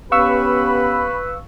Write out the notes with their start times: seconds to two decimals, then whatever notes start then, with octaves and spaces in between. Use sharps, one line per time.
0.12 B3 C#4 G4 B4 F5 B5 C#6 E6